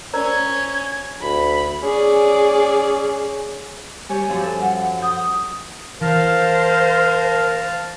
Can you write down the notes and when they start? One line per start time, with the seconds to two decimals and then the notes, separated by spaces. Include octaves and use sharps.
0.14 C#4 A#4 C5 D5 A#5 G#6
1.22 D2 B5
1.83 C#4 G#4 D5
4.09 G3 G4 C#5 G#5
4.29 F#2 F3 G3
4.43 A4
4.61 F#5
5.02 D#6 G6
6.01 E3 A#4 C5 F5 A5